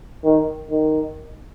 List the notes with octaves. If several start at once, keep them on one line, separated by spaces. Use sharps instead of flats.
D#3
D#3